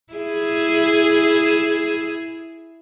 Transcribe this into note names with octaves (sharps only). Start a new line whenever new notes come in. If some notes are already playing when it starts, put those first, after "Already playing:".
E4 G#4